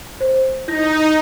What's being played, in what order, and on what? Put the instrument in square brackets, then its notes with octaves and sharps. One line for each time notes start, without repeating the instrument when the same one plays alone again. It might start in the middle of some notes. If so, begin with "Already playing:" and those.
[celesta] C5
[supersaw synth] D#4 [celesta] E4 G6 A#6